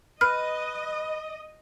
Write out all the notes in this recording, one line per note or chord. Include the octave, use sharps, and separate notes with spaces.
B4 D#5 F6